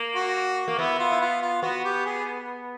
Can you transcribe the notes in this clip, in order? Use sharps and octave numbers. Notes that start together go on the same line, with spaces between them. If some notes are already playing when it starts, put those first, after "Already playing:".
Already playing: A#3
F#4
A#3
B3 E4
F4
E4
F4
F4
B3 F#4
G4
G#4